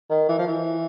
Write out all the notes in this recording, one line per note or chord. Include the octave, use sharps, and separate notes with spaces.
D#3
E3
F3
E3